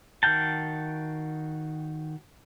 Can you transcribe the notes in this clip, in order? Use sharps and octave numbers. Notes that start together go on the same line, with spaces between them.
D#3 F#4 F5 G5 A5